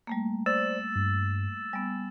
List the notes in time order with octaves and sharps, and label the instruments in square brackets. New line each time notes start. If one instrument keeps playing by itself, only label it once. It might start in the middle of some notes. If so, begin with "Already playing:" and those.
[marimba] G3 A3 A#3
[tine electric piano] C5 D5 [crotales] E6 A6 E7
[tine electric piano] G2
[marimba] G3 B3 [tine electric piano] G#5